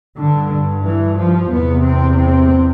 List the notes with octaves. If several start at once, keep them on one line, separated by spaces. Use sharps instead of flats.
G2 D3
E3
F3
E2 C3 B3
C4
C4